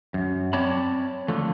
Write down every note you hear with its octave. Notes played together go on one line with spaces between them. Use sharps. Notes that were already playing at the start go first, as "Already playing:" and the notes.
F#2
C4 C#5 D5 A5 B5
D3 F3 A3